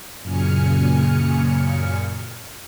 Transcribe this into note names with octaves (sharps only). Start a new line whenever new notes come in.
F#2 A#2 C#3 G#5 F6 C#7